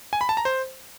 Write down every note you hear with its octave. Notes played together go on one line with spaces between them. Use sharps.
G#5
B5
A5
A#5
C5